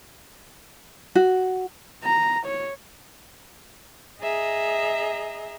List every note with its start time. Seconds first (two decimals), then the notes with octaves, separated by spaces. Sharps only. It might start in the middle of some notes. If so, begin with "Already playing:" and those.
1.15 F#4
2.04 A#5
2.46 C#5
4.21 G#4 D#5 E5 A#5